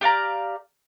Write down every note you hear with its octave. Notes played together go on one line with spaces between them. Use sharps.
G4 D5 F5 A#5